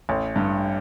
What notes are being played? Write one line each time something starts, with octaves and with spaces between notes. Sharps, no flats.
A1
G2